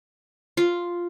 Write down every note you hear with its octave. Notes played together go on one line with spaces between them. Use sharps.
F4